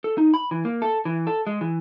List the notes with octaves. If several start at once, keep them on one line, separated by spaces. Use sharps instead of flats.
A4
D#4
B5
E3
A#3
A4
E3
A4
G#3
E3